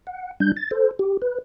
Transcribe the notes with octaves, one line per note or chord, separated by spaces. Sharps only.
F#5
G3 D4 G6
A6
A4 C5
G4
B4